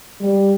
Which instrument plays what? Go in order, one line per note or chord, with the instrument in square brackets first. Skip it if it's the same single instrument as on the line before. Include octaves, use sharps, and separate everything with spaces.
[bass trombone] G3